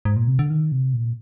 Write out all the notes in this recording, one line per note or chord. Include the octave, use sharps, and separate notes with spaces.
G#2
A#2
C3
D3
D#3
C3
A#2